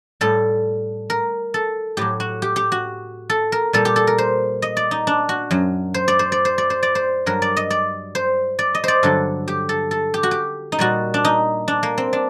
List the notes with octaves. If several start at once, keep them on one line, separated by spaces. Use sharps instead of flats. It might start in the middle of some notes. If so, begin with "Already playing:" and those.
A2 G3 A4
A#4
A4
A2 F#3 G4
F#4
G4
G4
F#4
A4
A#4
A#2 G3 A4
G4
A4
A#4
C5
D#5
D5
D#4
D4
F#4
F#2 F#3
C5
D5
C5
D5
C5
D5
C5
D5
C5
G2 F#3 A#4
D5
D#5
D5
C5
D5
D#5
C5 D5
G2 D3 F#3 A4
G4
A4
A4
G4
F#4
G4
D#4
A#2 G3 F#4
D4
D#4
D4
A#3
C4
D4